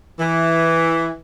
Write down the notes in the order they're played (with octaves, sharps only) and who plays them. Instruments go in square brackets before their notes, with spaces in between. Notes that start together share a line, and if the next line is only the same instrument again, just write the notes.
[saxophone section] E3